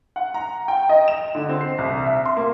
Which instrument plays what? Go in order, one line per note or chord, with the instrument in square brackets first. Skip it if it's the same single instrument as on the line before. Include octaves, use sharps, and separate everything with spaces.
[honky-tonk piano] F#5
A#5
G5
D#5
E7
D3
C4
C7
C2
E5
C6
A#3